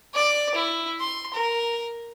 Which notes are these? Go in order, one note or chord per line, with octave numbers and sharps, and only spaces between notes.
D5
E4
C6
A#4